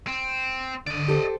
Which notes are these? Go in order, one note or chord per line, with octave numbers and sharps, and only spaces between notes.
C4
D3 D5 D#5
G4 A4 C5